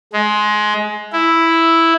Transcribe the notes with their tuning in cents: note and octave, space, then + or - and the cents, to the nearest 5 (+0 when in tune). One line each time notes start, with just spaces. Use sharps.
G#3 +20
E4 +0